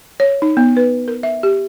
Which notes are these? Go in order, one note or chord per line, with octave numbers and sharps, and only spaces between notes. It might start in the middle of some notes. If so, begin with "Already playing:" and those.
C#5
D#4
B3
B4
A#4
E5
G4